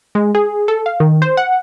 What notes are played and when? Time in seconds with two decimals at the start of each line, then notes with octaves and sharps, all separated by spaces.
0.15 G#3
0.35 G#4
0.68 A4
0.86 F5
1.00 D#3
1.22 C5
1.37 F#5